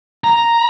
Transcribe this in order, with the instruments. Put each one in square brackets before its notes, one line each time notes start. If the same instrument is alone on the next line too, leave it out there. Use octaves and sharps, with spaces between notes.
[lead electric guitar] A#5